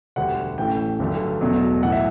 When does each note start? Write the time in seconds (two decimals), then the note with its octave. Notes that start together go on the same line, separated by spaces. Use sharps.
0.16 E1 D2 D3 G3 F#5
0.58 A1 A2 E3 A3 G5
1.00 G1 G2 D3 F#3 A3
1.41 E1 E2 B2 F#3 A3
1.82 B1 A2 E3 A3 F#5
1.92 E5